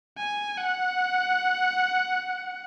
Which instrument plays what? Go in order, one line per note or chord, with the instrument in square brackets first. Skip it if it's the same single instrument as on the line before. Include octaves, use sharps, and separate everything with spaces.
[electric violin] G#5
F#5